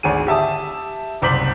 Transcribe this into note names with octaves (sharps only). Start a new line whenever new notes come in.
G#1 D2 G#4 D#7
G4 E5 A5 D#6
F#1 C2 C5 D6 B6 F#7